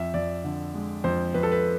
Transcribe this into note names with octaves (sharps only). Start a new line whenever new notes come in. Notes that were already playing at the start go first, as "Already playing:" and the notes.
Already playing: F2 E5
F2 D5
D3
G#3
F2 C5
F2 B4
A4
B4